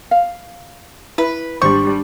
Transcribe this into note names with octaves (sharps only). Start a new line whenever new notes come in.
F5
E4 B4
G#1 G3 D4 C5 C#6